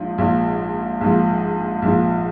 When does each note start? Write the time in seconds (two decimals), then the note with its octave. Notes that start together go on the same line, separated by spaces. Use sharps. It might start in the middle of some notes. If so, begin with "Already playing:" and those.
Already playing: A#1 G#2 F3
0.18 A#1 G#2 F3
1.01 A#1 G#2 F3
1.82 A#1 G#2 F3